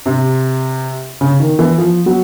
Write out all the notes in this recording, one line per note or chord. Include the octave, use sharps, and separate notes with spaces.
C3
C#3
D#3
E3
F3
F#3